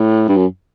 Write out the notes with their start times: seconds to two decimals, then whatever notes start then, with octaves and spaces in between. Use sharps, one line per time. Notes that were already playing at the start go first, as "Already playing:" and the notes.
Already playing: A2
0.28 G2
0.36 F#2